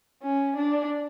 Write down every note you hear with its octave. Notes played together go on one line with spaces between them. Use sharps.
C#4
D4